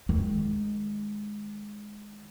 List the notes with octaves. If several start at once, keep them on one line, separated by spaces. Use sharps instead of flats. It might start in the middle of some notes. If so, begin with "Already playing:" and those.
D#3 G#3